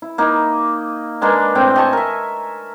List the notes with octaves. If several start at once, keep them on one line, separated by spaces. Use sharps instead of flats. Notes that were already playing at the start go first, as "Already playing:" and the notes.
E4
A#3 D#4
G#3 A#3 D4 B4
A2 C4 G5
D#5 G#5 A5 C#6
A#4 E5